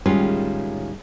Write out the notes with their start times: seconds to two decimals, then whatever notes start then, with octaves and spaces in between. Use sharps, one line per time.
0.06 A2 D#3 G3 G#3 C#4 F4